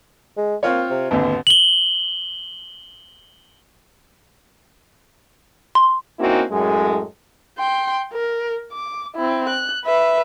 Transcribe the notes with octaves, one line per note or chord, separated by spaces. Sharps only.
G#3
A#3 C4 F4 C#5
C3
G#1 D#2 D3 B3
F#7 G7
C6
A#3 C4 C#4 D#4 E4 F#4
F#2 A2 G#3
G5 C6
A#4
D6
C4 E4
F#6
B4 E5